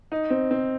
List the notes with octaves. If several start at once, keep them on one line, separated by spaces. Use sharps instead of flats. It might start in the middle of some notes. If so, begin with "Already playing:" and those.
D#4
C4
C4